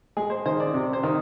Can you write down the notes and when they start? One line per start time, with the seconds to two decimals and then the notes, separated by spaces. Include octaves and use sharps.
0.17 G#3 G#4
0.30 C5
0.45 D#3 C5
0.60 D5
0.74 C3 D5
0.93 C5
1.03 D#3